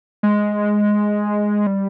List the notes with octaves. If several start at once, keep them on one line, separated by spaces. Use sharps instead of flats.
G#3
G3